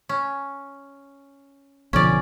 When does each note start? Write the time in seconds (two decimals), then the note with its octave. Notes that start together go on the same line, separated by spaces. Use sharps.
0.09 C#4
1.93 B1 D3 F3 C#4 D5